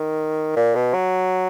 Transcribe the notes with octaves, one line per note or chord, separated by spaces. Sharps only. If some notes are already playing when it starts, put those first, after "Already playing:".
Already playing: D#3
A#2
B2
F#3